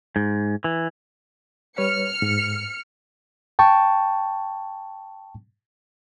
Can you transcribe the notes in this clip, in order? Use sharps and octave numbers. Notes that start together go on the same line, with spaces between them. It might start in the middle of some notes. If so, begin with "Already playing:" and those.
G#2
E3
G3 B4 C#5 F6 C#7
G#2
G5 A5 C#6